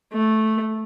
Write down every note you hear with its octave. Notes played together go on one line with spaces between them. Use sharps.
A3